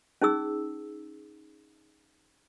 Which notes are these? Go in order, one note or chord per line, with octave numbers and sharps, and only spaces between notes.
C#4 D#4 G#4 E6